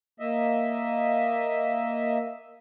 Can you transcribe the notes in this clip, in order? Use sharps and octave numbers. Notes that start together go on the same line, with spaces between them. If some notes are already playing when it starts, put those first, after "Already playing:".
A#3 D#5 E5